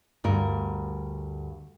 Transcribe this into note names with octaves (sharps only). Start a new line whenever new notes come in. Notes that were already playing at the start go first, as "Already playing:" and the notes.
D2 G2 A#4